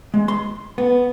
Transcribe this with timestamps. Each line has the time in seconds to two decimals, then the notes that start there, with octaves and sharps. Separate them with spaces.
0.14 G#3
0.28 C6
0.78 B3